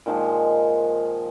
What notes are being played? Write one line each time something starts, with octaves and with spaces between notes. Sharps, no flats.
A#2 D#3 F3 G#3